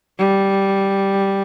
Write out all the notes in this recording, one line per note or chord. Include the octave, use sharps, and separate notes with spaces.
G3